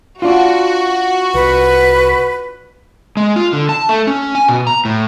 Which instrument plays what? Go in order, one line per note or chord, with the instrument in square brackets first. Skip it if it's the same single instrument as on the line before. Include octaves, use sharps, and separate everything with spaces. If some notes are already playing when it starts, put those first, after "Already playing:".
[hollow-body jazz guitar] D4 F4 [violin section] F#4
[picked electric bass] C2 [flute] B4
[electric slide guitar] G#3
F4
D3
A5
A3
C#4
G#5
B2
A#5
A2